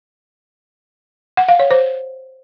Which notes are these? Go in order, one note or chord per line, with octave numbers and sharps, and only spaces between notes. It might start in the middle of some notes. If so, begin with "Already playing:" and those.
F#5
F5
C#5
C5